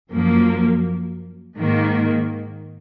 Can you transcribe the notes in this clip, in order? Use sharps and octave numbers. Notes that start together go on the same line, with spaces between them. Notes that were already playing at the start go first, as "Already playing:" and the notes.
F#2 F3 A#3
G#2 D#3 A#3